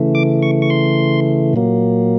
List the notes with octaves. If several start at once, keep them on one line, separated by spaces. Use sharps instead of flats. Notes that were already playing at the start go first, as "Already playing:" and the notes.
Already playing: C#3 E3 A3
D6
C#6
C#6
C6
A#2 F#3 A#3